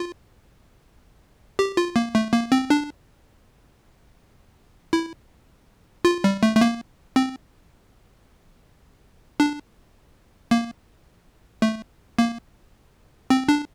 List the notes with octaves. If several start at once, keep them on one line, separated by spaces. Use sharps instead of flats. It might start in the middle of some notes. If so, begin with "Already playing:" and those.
Already playing: F4
G4
F4
A#3
A3
A#3
C4
D4
E4
F4
G3
A3
A3
A#3
C4
D4
A#3
A3
A#3
C4
D4